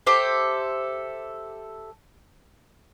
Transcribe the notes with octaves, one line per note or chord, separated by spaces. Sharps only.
G4 A4 C5 E5